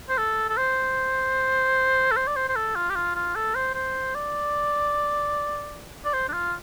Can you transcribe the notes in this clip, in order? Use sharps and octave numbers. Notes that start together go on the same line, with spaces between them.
C5
A4
A4
C5
A4
C5
D5
C5
C5
A4
F4
G4
F4
F4
A4
C5
C5
D5
D5
C5
D4
F4